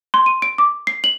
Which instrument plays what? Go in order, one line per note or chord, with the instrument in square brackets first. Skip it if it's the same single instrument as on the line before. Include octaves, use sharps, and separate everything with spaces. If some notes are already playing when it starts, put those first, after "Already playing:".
[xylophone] C6
D#7
D7
D6
C7
F#7